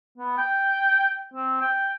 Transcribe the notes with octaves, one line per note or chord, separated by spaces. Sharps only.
B3
G5
C4
G5